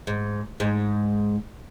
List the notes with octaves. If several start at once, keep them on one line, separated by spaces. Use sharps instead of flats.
G#2
G#2